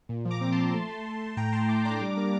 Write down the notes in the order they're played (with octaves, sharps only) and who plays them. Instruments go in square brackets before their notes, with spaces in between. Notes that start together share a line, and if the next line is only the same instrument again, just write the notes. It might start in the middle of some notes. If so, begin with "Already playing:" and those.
[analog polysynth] A#2
F3
A#5 D6
C4
F3 A5 C6
A3
A3
A3
A3
A2 G5 A#5
A2 A5 C6
A3 A#5 D6
D4 A#5 D6
G3 A#5 D6
A#3